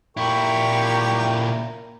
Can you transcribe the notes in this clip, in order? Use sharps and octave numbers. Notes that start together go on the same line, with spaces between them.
A#2 E4 G4 A#4 G5 C#6